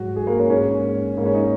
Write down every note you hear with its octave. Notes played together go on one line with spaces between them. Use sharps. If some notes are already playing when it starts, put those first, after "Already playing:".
Already playing: G#2 F#3 F#4
G#4
A#3
C#4
G#2 G#3 C#4
G#2 G#3 A#3
C#4
D#4